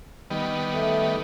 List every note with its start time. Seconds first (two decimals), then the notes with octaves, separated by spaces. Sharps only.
0.30 D#3 G3 B3
0.73 A3